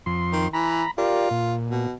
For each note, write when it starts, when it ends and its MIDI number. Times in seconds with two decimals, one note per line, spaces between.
0.06 0.48 41
0.06 0.48 84
0.33 0.47 51
0.53 0.83 52
0.53 0.91 82
0.53 0.91 83
0.98 1.55 65
0.98 1.29 67
0.98 1.29 70
0.98 1.29 74
1.31 1.87 46
1.71 1.95 47